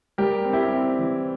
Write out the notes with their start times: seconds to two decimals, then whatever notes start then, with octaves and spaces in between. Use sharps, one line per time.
0.18 G3 G4 A#4
0.45 C4
0.53 E4 G4
0.72 C4
0.99 E3